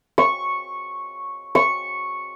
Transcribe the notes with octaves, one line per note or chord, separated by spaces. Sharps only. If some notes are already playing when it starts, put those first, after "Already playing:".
C#6
C#6